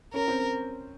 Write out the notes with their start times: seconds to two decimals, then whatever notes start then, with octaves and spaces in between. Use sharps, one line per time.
0.14 C#4 A#4
0.28 C4